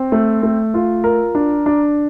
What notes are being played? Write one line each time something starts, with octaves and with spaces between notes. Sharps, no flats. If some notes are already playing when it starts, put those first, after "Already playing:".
Already playing: C4
A3
A3
F4
A#4
D4
D4